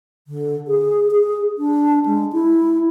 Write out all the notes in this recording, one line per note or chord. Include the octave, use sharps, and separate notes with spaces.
D3
G#4
G#4
D4
G#3
E4